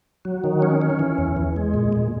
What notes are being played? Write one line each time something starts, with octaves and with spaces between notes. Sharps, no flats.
F#3
D#3
C#4
C#4
E3
E2
E2
G#3
A#2
A#2